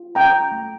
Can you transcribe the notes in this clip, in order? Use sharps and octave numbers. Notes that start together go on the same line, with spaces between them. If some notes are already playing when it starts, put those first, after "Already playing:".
Already playing: F4
C#4 G5 A#5
A3